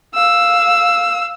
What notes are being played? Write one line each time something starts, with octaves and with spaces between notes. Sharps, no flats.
F5 E6